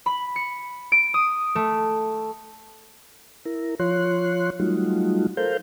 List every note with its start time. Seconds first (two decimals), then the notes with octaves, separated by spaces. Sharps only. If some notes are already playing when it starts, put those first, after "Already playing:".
0.06 B5
0.36 C#7
0.92 D7
1.14 D#6
1.55 A3
3.45 E4 A#4
3.79 F3 F4 C#5 C6 F#6
4.60 F#3 G3 A3 D#4 F4 F#4
5.37 A4 A#4 C5 F5 G6